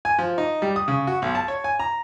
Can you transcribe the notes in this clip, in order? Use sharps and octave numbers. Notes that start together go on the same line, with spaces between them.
G#5
F3
D#4
G3
D#6
C#3
F#4
B1
A5
C#5
G#5
A#5